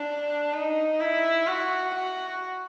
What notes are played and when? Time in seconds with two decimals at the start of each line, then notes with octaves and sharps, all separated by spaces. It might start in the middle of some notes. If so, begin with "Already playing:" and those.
Already playing: D4
0.53 D#4
1.00 E4
1.47 F#4
1.94 F#4